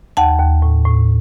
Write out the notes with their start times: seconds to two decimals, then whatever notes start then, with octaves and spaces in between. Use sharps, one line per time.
0.17 D#2 F#5 A5
0.39 D#2
0.62 A2
0.85 A2